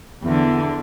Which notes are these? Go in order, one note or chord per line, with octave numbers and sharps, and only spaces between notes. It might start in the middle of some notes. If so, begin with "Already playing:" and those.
E2 D3